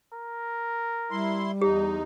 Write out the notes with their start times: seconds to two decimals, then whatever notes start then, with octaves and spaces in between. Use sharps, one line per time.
0.13 A#4
1.11 G3 E4 C6
1.62 E2 D#4 G4